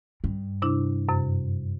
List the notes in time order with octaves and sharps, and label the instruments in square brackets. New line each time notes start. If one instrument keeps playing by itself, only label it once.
[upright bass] G2
[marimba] C3 D4 E4
F#2 C3